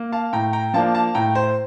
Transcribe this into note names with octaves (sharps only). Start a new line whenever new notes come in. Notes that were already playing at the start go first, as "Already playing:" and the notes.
Already playing: A#3
F5 A5
A2 G5 A#5
G5 A#5
F3 A#3 D4 F5 A5
F5 A5
A2 G5 A#5
C5